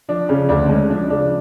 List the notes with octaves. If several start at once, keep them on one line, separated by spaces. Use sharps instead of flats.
F3 D4
C#3 C#4
D2 D4
G#3 C#4
F3 D4
C#3 D4